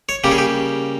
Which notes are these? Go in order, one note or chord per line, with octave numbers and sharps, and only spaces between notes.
C#5
C#3 G3 A#3 G4
G#4
G4